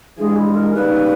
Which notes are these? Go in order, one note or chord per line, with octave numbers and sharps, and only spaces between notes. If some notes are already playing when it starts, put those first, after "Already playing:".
G2 E3 G#3 G#4
E4
A#4
C#3 G3 A#3 D#4 B4